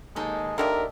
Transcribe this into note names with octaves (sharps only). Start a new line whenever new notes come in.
D#2 G#3 D#4 A4
D3 D#3 A#3 D4 G4 A#4 E5